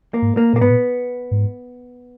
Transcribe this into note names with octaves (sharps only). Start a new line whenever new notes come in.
A#3
G#2
A#3
A#2 A#3
G#2 B3
A#2
G#2